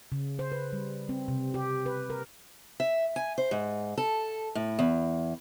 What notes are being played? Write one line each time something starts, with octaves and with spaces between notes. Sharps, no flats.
C#3
C5
B4
G3
C4
C3
G4
B4
A#4
E5
G#5
C5
G#2
A4
A2
E2